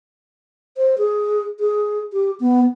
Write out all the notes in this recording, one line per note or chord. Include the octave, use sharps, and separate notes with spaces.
C5
G#4
G#4
G4
B3